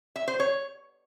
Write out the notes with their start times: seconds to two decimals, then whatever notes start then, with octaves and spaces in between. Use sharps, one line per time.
0.16 E5
0.28 C5
0.40 C#5